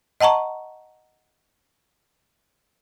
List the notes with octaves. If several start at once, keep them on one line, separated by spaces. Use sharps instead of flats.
D#5 F#5 A5 A#5 C#6